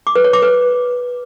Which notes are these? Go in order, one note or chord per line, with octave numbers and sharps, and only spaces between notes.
D6
B4
C#5
D6
B4